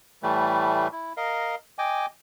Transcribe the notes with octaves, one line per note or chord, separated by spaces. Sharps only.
A2 E3 G3 A3
E4
A#4 D#5 F5
D#5 G5 G#5 D6